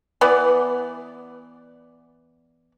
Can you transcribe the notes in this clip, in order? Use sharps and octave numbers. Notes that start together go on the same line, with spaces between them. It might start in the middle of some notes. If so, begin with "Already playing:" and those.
E3 B3 B4 D5